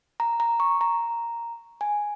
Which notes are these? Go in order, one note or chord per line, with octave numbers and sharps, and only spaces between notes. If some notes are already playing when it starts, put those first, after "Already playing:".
A#5
A#5
C#6
A#5
G#5